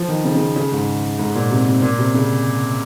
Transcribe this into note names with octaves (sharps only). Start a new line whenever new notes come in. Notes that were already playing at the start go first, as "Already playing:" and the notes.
Already playing: F3
D#3
C#3
C#3
C#3
G#2
G#2
A#2
C3
C3
A#2
C3
C#3